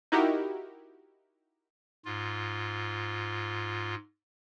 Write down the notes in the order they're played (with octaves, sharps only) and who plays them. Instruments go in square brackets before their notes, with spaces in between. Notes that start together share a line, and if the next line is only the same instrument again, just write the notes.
[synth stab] D#4 E4 F#4 G4 A#4
[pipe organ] G#2 F4